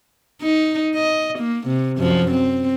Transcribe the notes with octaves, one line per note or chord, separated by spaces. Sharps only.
D#4
D#5
A#3
C3
F#2 F3
C4